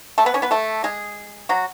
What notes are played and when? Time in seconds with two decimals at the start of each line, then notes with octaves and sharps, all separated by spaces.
0.18 A3 A4
0.26 B3 B4
0.34 C#4 C#5
0.42 B3 B4
0.51 A3 A4
0.84 G#3 G#4
1.49 F#3 F#4